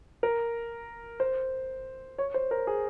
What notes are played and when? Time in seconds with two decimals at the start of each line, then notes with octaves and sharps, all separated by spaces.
0.23 A#4
1.20 C5
2.18 C#5
2.34 C5
2.51 A#4
2.67 G#4